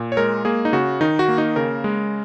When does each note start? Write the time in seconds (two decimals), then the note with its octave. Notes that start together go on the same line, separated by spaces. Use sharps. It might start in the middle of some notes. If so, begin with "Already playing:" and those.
Already playing: A#2
0.12 C#5
0.17 G#3 A#4
0.45 A#3 G#4
0.65 D#4
0.73 C#3 F#4
1.01 D#3 D#4
1.19 F#4
1.28 A#3
1.38 D#4
1.56 C#3 A#4
1.84 G#3